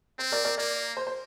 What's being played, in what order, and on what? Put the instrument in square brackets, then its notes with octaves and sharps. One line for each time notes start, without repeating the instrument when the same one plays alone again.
[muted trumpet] C4 [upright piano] C5
[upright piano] A#4 D5
A#4 D5
[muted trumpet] A#3 [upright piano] A#4 D5
[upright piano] C5
C5